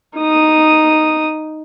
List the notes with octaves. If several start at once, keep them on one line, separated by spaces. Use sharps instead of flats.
D#4 D#6